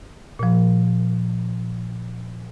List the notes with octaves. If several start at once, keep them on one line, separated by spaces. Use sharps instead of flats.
A#2 F3